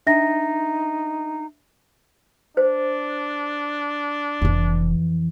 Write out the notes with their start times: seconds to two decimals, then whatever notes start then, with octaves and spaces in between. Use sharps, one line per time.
0.07 D4 D#4 E5 A#6
2.57 D4 C5
4.42 F1 F2 E3